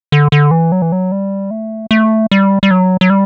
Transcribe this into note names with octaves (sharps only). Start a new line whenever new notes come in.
D3
D3
E3
F#3
E3
F#3
G3
A3
A3
G3
G3
F#3
F#3
G3